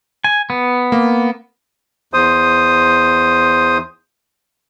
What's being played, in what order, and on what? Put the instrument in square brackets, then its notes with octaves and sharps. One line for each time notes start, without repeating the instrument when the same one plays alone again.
[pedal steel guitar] G#5
B3
[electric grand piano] A#3
[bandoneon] E2 C5 D#6